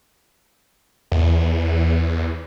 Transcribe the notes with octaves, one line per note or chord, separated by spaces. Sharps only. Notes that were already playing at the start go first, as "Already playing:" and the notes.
E2